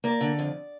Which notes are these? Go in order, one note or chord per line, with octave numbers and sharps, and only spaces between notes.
A#3 D5
D3
F2